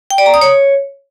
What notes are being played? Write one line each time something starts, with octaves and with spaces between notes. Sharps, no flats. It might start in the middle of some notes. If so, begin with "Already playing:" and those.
G5
D5
A#5
D#6
C#5